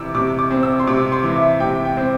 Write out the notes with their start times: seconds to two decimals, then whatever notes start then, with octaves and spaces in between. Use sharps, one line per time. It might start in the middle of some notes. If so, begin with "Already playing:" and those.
Already playing: C3 E3 D6 E6
0.15 C3 D6
0.39 D6
0.51 C4
0.63 E6
0.80 C6
0.87 C3 D6
1.12 C6
1.23 E3
1.36 E5
1.60 C3 G5
1.85 G5
1.97 C4